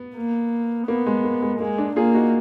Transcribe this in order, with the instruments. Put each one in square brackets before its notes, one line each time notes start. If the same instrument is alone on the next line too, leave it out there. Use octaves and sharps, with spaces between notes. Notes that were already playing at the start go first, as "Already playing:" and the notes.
Already playing: [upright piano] B3
[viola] A#3
[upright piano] A#3 [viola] B3
[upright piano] G#3
A#3
G#3
[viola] G#3 [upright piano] A#3
[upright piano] A#3 D4
[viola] A#3 [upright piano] F4 G#4
[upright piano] D#4 F#4